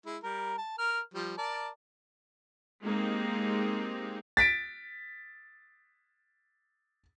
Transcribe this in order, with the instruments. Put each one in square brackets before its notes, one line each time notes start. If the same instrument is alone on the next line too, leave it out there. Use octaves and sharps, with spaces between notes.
[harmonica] G#3 E4
G3 A#4
A5
A#4 F6
F3 G3
A#4 D5 A5
[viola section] G#3 A#3 C4 D#4 G4
[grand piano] A6 B6 D7